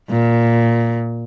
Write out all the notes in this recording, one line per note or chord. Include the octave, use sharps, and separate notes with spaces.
A#2